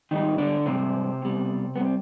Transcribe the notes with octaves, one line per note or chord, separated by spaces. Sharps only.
G#2 D#3 G3 D#4
D3 D4
G#2 C3 G3 C4
B2 G3
C3 G3 B3
C4